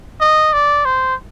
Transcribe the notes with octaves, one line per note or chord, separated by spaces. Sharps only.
D#5
D5
C5